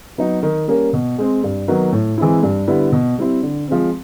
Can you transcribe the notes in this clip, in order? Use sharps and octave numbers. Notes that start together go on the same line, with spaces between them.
F#3 B3 D#4
D#3
G3 A#3 C#4
B2
G#3 C4
G2
D#3 F#3 B3
A2
E3 G#3 C4 E4
G2
D3 G3 B3 E4
B2
G3 C4 E4
D3
F3 G#3 C4